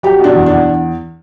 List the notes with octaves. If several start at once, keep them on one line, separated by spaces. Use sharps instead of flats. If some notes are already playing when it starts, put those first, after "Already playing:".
F#3 G4
B2 D4
E2
D4
E2